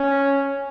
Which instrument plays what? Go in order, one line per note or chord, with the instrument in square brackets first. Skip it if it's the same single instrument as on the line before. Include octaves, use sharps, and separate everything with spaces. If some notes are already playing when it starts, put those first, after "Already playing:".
Already playing: [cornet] C#4